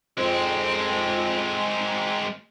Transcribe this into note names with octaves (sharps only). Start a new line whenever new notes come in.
F2 G#3 C4